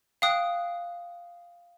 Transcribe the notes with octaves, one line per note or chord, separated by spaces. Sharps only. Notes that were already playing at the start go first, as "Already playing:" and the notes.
F5 G5 D#6 F#6